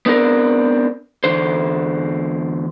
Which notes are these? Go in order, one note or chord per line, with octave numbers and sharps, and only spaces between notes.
B3 C4 D4 A#4
E2 D3 C5